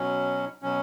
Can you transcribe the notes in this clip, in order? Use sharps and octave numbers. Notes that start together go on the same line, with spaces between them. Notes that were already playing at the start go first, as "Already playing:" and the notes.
Already playing: B2 F#3 C#4
B2 F#3 C#4